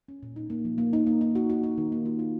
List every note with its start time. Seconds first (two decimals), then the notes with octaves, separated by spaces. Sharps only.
0.08 C#4
0.23 A#2
0.36 D#4
0.50 A#3
0.65 F3
0.78 A#3
0.93 D#4
1.07 A#3
1.21 D#4
1.35 F#4
1.50 F#4
1.63 D#4
1.78 D#3
1.92 A#3
2.05 F4
2.19 F4